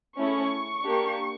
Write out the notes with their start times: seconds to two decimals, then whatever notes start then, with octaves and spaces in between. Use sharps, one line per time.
0.18 A3 C#4 E4 G#4 C#6
0.86 A#3 D4 G4